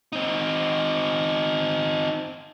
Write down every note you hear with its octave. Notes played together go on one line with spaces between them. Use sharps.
C4 D#4